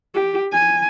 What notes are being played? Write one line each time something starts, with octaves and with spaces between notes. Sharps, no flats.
G4
G#5